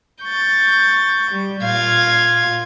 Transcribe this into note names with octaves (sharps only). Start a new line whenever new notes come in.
C#6 G6 A6
G3
A#2 F4 F5 G#6